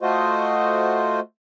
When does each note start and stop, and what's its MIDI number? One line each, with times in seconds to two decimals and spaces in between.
0.01 1.20 57
0.01 1.20 65
0.01 1.20 66
0.01 1.20 72
0.01 1.20 75